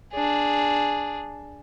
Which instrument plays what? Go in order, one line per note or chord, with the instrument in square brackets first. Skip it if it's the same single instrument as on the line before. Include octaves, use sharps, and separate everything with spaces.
[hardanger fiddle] D4 G#4